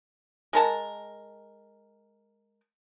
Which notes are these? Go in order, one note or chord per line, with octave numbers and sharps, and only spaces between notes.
G#3 A#4 A5